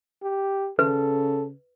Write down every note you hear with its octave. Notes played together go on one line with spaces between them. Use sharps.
G4
C#3 A4 B4